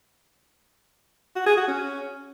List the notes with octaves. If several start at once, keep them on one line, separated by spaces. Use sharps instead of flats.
F#4
G#4
F#4
C#4